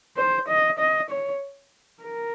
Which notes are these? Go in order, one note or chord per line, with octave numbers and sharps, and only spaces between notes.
C5
D#5
D#5
C#5
A#4